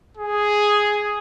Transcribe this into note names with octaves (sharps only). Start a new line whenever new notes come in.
G#4